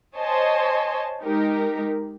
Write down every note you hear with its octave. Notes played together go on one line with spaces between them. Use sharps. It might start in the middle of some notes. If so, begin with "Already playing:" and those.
C5 C#5 D#5 G#5 A5 C6
G#3 D#4 G4 A#4